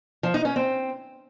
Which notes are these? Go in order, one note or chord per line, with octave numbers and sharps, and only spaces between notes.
F3
D#4
C#4
C4